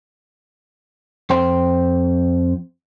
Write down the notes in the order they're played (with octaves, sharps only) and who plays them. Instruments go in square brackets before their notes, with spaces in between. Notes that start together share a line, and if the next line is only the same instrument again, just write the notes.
[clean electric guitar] F2 C5 G5 C6